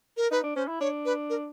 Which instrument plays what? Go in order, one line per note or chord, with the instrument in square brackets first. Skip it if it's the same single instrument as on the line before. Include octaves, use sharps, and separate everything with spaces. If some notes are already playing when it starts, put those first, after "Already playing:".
[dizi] A#4
[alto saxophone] D#4 [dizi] B4
[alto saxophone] D4
[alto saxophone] C#4 [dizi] C5
[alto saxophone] E4
[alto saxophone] D4 [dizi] C#5
[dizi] B4
A#4